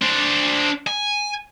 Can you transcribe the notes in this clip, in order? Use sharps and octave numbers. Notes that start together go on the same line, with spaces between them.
D4 C5
G#5